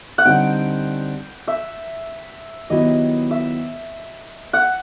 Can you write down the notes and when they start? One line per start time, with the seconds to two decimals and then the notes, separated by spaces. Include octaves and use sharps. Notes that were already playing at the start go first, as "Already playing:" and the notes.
0.18 F#5
0.25 D3 G3 C4 D#4 G5
1.48 E5
2.70 D#3 F#3 B3 E4 G4 D#5
3.31 E5
4.53 F#5